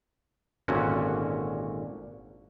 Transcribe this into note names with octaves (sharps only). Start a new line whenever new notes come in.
G#1 A#2 D3 C#4 F#4